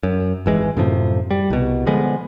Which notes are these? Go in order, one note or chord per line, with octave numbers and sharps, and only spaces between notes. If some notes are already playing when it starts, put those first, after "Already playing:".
F#2
G#1 E3 G#3
F#2 A2 C3 F3
G3
C2 B2
D3 F3 G#3 B3